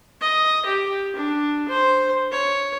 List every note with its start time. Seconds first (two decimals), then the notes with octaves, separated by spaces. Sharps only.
0.21 D#5
0.66 G4
1.16 D4
1.69 C5
2.32 C#5